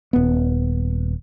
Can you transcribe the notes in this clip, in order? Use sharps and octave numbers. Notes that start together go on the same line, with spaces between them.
D#1 B3